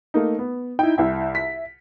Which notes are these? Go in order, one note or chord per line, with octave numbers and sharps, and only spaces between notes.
A3 A#3 D#4
B3
D#4 E4 G5
C2 E4 E5 G5
B6